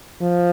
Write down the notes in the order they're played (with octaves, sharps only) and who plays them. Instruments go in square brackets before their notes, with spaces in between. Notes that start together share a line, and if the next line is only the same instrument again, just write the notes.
[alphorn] F3